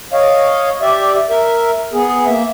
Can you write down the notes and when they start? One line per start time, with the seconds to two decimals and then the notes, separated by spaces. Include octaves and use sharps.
0.13 C#5 D#5 F5
0.82 G4 D5 E5
1.30 A#4 E5
1.93 B3 G#4
2.26 A#3 E5